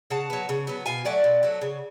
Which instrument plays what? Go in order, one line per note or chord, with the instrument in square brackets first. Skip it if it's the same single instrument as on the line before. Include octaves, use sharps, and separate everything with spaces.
[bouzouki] C#3 F#5 A5
F#3 B3
C#3
F#3 B3
B2 F5 G#5
F#3 A3 D5 F#5
B2
F#3 A3
C#3